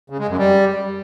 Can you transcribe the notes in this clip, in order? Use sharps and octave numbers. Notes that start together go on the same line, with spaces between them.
C#3
G#3
F#2
G3